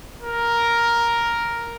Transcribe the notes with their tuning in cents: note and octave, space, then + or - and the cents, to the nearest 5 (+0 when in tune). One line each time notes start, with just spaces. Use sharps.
A#4 +5